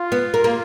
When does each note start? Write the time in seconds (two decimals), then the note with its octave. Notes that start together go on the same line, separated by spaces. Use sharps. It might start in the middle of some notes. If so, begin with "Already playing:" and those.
Already playing: F4
0.12 B3
0.34 A#3
0.44 A#3